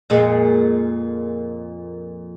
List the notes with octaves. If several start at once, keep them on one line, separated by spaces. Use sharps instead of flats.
F2 A#2 G#3